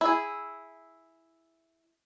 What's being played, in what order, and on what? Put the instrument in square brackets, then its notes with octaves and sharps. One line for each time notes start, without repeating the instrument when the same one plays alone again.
[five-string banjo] E4 G#4